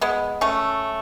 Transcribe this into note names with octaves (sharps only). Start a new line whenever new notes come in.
G#3 B3
A3 C#4